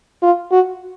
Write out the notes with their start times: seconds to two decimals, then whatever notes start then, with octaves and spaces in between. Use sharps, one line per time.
0.23 F4
0.52 F#4